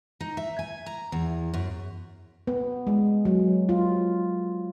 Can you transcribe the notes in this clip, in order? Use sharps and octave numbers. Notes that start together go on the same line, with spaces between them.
D#4
E5
G#5
A#5
E2
F#2
B3
G#3
F#3
F4